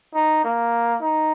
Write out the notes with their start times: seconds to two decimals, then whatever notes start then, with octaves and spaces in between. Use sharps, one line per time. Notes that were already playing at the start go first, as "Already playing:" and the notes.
0.14 D#4
0.44 A#3
1.01 D#4